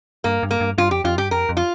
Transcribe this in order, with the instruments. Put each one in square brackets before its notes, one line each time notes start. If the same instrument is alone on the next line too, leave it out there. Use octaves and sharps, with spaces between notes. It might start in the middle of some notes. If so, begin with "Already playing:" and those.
[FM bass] G2 [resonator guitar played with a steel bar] A#3
[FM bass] G2
[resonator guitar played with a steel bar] A#3
[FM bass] G2
[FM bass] G2 [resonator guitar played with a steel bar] F4
[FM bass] F2 [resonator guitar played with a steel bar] G4
[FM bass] F2 [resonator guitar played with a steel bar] F4
[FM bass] G2 [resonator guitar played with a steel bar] G4
[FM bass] F2 [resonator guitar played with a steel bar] A#4
[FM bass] F2
[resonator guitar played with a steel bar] F4